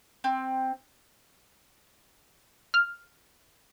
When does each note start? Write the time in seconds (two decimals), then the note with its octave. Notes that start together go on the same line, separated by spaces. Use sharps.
0.24 C4
2.74 F6